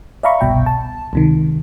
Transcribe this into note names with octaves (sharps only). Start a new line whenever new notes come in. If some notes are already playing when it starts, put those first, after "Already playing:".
D5 E5 F5 A#5 B5 C#6
G1 C2 B2 E5 G5
A5
C#2 C3 D#3